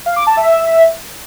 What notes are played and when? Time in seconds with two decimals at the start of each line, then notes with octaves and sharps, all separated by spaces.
0.06 F5
0.16 D6
0.27 A5
0.37 E5